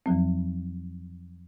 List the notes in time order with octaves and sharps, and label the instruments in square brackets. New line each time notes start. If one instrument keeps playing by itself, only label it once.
[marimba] F2 F3 F#3 C4